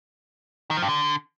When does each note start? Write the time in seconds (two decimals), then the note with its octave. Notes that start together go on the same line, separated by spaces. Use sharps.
0.71 D#3
0.77 F3
0.82 G2
0.88 D3